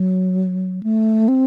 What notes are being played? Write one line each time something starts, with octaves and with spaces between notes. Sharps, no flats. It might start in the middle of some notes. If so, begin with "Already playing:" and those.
Already playing: F#3
A3
C4